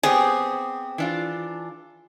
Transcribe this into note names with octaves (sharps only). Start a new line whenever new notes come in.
B3 C4 G4 G#4
E3 D4 F4